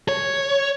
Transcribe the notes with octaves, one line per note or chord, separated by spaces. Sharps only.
C#5